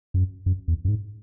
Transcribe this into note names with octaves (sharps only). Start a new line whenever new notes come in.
F#2
F#2
E2
F#2
G#2